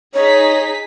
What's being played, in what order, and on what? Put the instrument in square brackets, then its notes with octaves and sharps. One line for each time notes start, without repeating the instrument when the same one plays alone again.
[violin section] D#4 G#4 B6 [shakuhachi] C#5